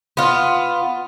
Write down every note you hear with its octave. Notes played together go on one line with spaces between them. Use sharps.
B3 F4